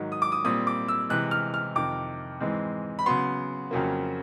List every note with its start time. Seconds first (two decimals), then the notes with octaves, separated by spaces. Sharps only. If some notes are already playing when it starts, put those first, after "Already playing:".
Already playing: G#2 D#3 F#3
0.12 D#6
0.22 D6
0.32 D#6
0.45 A#2 G3 C4 D#6
0.67 D6
0.88 E6
1.10 C3 E3 G#3 F#6
1.31 F6
1.54 F6
1.75 F2 C3 D#3 D6
2.40 G#2 E3 G#3 C4
2.99 B5
3.06 C#3 F#3 B3 C6
3.71 F2 C#3 F#3 A#3